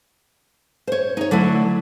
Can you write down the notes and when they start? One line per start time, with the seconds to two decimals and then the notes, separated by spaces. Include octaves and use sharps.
0.87 C5 C#5
1.17 D#4 C#5
1.31 D3 F#3 A3 E4